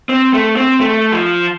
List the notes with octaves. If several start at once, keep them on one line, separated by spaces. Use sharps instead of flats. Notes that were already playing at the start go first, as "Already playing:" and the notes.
C4
A3
C4
A3
F3